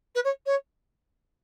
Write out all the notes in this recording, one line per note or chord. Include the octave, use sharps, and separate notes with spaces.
B4
C#5
C#5